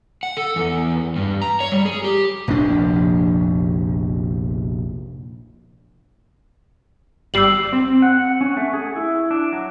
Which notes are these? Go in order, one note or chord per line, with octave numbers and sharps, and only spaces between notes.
F#5
A4
E2
G2
A#5
C#5
G3
G#4
G4
F1 A#1 F2 D4
G1 G3 E6 C7 F#7
C4
F#5
F#5
C#4
A3
G#4
E4
D4
F#3